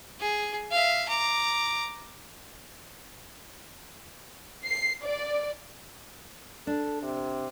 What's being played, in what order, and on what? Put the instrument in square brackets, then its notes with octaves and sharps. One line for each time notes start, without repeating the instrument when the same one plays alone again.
[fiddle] G#4
E5 F5
A#5 D6
[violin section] C7
D5
[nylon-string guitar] D4 [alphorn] A4
[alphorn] C3